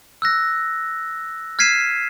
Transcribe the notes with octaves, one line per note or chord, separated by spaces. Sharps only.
E6 F#6 A#6
F6 G#6 B6 C7 D#7 E7